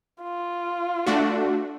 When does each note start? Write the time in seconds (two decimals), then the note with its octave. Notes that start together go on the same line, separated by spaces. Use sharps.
0.22 F4
1.07 A3 D4 F#4